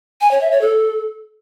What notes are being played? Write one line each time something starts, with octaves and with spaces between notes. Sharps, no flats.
G#5
C#5
E5
C#5
A4